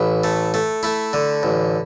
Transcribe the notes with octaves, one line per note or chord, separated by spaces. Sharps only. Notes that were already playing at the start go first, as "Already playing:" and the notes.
Already playing: A1 E4
A3
A3
A3 E4
D3
A1